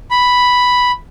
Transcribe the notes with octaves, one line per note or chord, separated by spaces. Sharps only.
B5